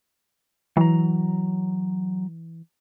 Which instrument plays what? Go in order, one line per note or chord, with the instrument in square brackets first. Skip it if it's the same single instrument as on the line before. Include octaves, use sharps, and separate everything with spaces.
[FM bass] E3 [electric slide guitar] F#3 A#5